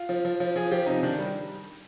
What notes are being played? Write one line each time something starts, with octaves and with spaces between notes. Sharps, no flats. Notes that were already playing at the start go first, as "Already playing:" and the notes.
Already playing: F4
F3
F3
F3
F3 G#4
F3 G4
C3 D#4
D#3 D4
G3